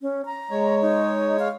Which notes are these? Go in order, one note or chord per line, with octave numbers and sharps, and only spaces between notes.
C#4
A#5
G#3 C#5
D#4
F5